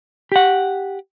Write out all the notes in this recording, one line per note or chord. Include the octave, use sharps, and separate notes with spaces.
G4 F#5